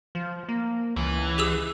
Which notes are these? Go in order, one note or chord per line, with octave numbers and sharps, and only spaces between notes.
F3
A#3
C#2 E3
G4 G#4 E6